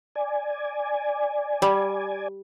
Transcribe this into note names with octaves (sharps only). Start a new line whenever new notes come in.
D5 G#5
G3